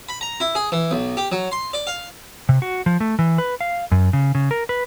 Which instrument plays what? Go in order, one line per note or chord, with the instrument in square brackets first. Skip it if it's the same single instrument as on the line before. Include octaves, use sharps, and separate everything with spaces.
[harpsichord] B5
A#5
E4
G#4
E3
B1
G4
F#3
C6
D5
F5
[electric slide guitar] C3
F#4
F3
A3
E3
B4
F5
F#2
C#3
C#3
A#4
B4